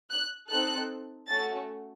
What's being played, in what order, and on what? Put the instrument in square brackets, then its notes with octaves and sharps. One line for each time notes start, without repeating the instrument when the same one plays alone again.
[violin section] F#6
C4 D#4 A4 F#6
A3 C#4 F#4 A4 A6